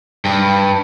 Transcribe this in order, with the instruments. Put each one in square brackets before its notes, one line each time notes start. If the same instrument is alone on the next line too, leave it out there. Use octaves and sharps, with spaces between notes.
[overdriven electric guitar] G2